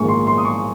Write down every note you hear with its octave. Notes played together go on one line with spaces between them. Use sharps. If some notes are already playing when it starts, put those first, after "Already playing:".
Already playing: A#1 G#2 D#3 G#3 C#6
C6
C6
D#6
C#6